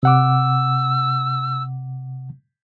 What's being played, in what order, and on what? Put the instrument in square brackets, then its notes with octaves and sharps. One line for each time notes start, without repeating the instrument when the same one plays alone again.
[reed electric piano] C3 F#5 D6 [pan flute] E6